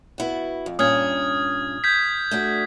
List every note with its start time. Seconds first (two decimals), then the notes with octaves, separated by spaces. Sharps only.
0.18 B3 E4 F#4
0.66 F2
0.79 G2 A#2 C#4 D#6 F6 G#6
1.84 G6 G#6 B6
2.31 A3 D4 F#4